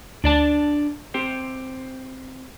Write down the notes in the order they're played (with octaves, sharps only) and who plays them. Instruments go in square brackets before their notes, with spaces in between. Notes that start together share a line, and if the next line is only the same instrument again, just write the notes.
[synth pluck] D2 [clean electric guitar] D4 D5 A5
[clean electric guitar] C4 G4 C5